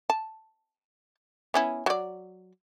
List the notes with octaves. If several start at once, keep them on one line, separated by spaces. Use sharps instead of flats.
A5
B3 C#4 E4
F#3 D5